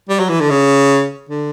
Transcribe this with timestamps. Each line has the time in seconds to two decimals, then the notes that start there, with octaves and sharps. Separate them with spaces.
0.09 G3
0.20 F#3
0.29 E3
0.40 D3
0.50 C#3
1.29 D3